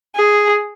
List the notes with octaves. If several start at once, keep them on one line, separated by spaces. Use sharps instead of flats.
G#4